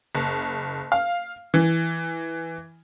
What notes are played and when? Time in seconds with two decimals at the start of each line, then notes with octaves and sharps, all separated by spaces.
0.15 F#1
0.92 F5
1.54 E3